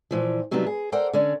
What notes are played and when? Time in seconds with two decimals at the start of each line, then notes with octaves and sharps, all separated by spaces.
0.11 A#2 E3 F3
0.51 C3 F#3 G3 B3 D4 D#4
0.67 G#4
0.92 A4 A#4 C5 D5 F#5 G5
1.13 D3 C#4 C#5 D5